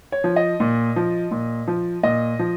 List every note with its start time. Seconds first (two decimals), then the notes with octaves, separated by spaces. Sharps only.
0.12 C#5
0.24 F3
0.36 D#5
0.60 A#2
0.96 F3
1.31 A#2
1.67 F3
2.03 A#2 D#5
2.39 F3